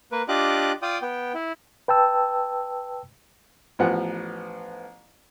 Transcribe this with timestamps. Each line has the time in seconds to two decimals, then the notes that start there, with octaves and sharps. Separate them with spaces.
0.12 A#3 A#4 B4
0.28 D4 F4 G4 D#5 D6 F#6
0.82 F4 D5 G5 D#6
1.02 B3 G5
1.35 E4
1.88 B4 G5 A5 E6
3.79 A1 F3 B3 F#5